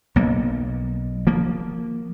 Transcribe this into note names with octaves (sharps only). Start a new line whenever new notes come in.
B1 A#3
F3 A#3